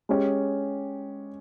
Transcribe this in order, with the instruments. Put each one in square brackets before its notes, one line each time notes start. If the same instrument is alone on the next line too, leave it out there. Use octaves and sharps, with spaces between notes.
[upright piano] G#3 C#4 G4